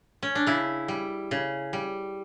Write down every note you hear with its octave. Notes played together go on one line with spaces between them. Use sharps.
C#4
D4
C#3 E4
G3
C#3
G3